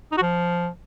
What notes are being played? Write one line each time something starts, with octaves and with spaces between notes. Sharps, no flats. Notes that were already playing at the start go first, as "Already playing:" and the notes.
D#4
F#4
F3